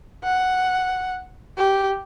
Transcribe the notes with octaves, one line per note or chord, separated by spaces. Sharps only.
F#5
G4